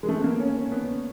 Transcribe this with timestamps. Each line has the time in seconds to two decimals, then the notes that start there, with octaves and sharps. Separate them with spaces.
0.03 G#3
0.09 A3
0.19 B3
0.24 A#3
0.40 C#4
0.56 C#4
0.72 B3